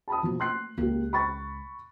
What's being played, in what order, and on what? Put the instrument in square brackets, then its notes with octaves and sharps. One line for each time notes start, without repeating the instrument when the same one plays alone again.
[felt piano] A5 B5 D#6
[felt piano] B2 F3 [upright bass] A3 A#3
[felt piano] C6 F#6 C7
[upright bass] C#2 G#3 [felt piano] A#3 G4
[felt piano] B5 C#6 A6